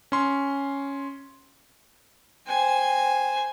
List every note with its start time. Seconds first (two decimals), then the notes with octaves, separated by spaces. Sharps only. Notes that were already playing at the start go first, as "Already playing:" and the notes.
0.12 C#4 C6
2.47 C5 G5 G#5